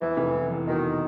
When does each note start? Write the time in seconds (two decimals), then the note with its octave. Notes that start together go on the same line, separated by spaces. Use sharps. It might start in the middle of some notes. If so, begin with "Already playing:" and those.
0.01 E2 E3
0.17 F1
0.34 E2
0.50 E2
0.67 B2 D#3